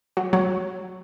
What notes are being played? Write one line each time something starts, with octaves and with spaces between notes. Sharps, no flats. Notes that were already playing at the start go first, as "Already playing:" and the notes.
F#3
F#3